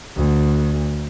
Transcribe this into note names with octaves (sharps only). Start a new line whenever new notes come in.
D2